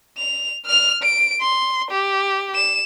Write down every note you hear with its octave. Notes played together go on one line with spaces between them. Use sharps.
F7
F6 F7
D7
C6
G4
E7